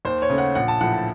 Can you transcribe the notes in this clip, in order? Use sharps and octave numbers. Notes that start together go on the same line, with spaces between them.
D#2 C5
C#5
C#3 A3
F#5
A#1 F#5
A5
A2 F3 F#5
A5